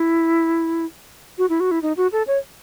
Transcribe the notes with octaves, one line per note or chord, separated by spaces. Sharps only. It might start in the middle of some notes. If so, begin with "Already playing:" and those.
Already playing: E4
F#4
E4
F#4
E4
D#4
F#4
A4
C#5